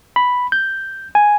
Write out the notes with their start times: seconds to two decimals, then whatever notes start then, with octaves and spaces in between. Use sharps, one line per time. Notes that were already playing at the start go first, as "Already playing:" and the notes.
0.16 B5
0.52 G6
1.15 G#5